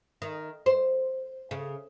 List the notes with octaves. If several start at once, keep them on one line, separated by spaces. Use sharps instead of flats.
D#3
C5
C#3